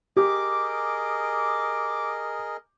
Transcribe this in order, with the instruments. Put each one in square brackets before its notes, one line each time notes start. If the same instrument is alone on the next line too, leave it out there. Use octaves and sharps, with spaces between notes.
[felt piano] G4 [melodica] G#4 A#4 D#5 [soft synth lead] D6